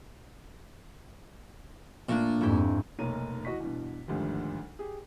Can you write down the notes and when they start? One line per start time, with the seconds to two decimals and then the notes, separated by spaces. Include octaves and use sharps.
2.09 A#2 A3 A#3 D4
2.41 F2 G#2 A3 E4 G4
2.99 F1 B1 A#3 A#4 C#5 D#7
3.45 E2 F#4 D#5 C#6 B6
3.60 E2 G2 B2
4.08 G#1 D2 G2 F3 G3
4.79 G4 G#4